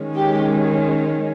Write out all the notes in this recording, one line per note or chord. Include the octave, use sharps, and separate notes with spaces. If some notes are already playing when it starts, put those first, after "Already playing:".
Already playing: D#3 G#3 C#4
G4